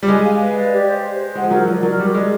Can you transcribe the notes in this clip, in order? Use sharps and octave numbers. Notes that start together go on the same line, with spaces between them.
G3
G#3 G#5
F5
B4
D5
G4
C5
C5
C5
G#3 F#5
F3
F#3 A#4
F3 D5
F#3 A#4
G3 F#4
G#3 D5